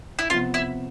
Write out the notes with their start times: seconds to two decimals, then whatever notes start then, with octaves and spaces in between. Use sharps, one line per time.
0.19 E4
0.30 C3 F3 B3 F4
0.54 E4